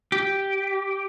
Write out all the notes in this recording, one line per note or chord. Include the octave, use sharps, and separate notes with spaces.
G4